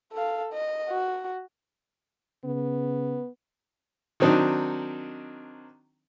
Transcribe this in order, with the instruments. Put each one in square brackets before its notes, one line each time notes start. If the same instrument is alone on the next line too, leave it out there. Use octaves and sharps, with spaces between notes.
[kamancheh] A4 F5
D#5
F#4
[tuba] C#3 [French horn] B3
[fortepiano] D#3 F#3 C4 D4 D#4